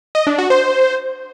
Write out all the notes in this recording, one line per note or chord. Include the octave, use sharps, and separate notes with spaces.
D#5
D4
F#4
C5